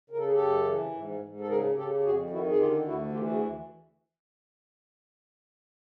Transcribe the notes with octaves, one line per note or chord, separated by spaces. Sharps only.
C#3 A#4
A4
G#4
G4 A4
F#2
E3
G#2
G#2
A4
C#3 G#4 A#4
C#3 G4 A4
G4
F2 F#4 G#4
D#3 E4 F#4
G#4
D3 F4 G4
D2 E4 F#4
E3 F4 G4
F#4 G#4